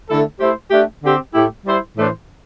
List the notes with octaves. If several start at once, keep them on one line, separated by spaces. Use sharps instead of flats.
D3 A3 E4 A4
A3 E4 G4 C5
A3 D4 G4
D3 C4 G4
A2 A3 E4 G4
G3 E4 C5
A2 E3 A3 D4 C5